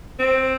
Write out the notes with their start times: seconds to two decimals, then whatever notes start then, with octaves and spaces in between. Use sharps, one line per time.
0.19 C4